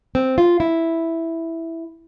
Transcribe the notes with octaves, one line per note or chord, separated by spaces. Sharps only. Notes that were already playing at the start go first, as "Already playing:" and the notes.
C4
F4
E4